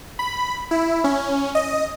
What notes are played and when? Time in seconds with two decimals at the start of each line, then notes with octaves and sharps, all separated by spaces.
0.19 B5
0.71 E4
1.04 C#4
1.55 D#5